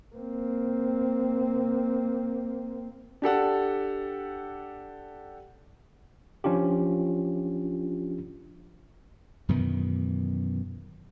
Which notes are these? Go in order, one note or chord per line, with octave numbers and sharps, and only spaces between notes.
A#3 C4
D4 G4 A4 F#5
F3 C#4 D4 F4 G4
F#2 B2 D#3 E3